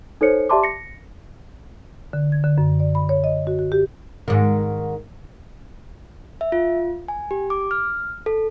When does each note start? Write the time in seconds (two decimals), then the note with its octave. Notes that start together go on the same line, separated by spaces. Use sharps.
0.21 D#4 A4 C5 C#5 C#7
0.49 G4 D5 E5 A5 C6 D6
0.63 A#6 C#7
2.13 D3
2.32 G#6
2.44 D3
2.58 F#2
2.80 D5
2.95 B5
3.09 C#5
3.24 D#5
3.47 F#4
3.59 F#4
3.72 G4
4.28 G#2 D#3
6.41 E5
6.52 F4
7.08 G#5
7.31 G4
7.50 D6
7.71 F6
8.26 A4